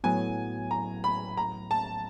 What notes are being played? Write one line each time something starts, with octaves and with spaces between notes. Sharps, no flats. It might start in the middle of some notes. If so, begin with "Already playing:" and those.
A2 F#3 B3 G#5
A#5
B5
A#5
A5